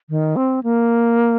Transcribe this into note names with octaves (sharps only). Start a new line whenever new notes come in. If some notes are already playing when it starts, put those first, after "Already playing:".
D#3
C4
A#3